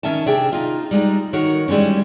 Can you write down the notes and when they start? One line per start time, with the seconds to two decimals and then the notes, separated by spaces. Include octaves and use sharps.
0.03 D#3 C#4 E5 G#5 A5
0.26 C3 D4 G4 G#4 G5
0.52 D#4 F4
0.91 G3 G#3 D#4
1.33 D#3 F#4 A#4 C#5
1.68 E3 G3 G#3 C4 C#4